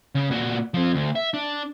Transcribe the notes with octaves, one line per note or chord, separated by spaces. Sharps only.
C#3
A#2 F#4
F3 C4
D2
E5
D4